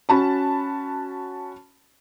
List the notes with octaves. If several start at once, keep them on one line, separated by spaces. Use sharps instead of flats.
C#4 F#4 A5 B5